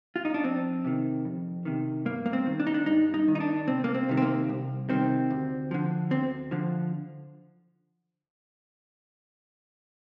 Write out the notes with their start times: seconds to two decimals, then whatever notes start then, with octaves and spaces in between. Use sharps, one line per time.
0.16 F4
0.25 D#4
0.34 D4
0.44 F2 C4
0.84 C3 D#3
1.25 F2
1.65 C3 D#3
2.05 G2 A#3
2.26 A#3
2.33 C4
2.46 D#3
2.60 D4
2.67 D#4
2.74 D4
2.86 G2 D#4
3.14 D#4
3.28 D#3
3.35 D#4
3.40 D4
3.67 C2 C4
3.84 A#3
3.94 C4
4.09 C3 D#3
4.17 C4
4.22 A#3
4.49 C2
4.89 C3 D#3 C4
5.30 D2
5.71 D3 F3
6.11 D2 C4
6.51 D3 F3